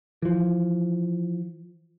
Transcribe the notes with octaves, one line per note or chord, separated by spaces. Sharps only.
E3 F3